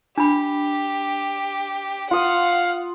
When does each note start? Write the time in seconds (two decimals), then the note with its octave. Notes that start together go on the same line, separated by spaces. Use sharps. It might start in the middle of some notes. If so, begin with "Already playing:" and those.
0.18 D4 G4 B5
2.11 F4 F5 F#5 D#6